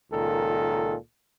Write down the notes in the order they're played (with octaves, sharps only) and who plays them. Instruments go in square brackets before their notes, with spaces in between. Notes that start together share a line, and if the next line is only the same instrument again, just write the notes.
[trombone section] C#2 A#2 D#3 A4